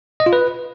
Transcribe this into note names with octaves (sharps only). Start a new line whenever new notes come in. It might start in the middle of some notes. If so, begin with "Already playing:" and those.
D#5
F4
B4